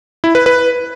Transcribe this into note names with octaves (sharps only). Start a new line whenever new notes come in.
E4
B4
B4